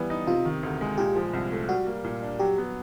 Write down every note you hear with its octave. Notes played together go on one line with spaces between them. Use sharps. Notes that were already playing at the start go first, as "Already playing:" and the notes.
Already playing: E3 G3 B3
D#4
C3 F4
D#3
D2
G#3
A#2 G4
F3
C2
A3
G3 F#4
A#3
A#2
D4
F#3 G4
B3